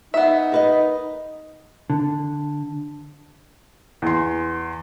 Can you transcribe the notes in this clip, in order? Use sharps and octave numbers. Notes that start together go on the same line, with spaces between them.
B3 D#4 E5
A#4 B4 D#5
D3
E2 C6